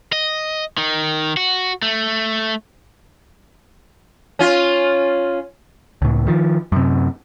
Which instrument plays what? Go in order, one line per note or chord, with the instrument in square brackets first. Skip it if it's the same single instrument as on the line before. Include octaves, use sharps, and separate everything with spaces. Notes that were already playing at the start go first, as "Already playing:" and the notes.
[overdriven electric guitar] D#5
D#3
F#4
A3
[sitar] C#4 F4
[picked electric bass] C#2 A2
D#3 F3
F#2 C3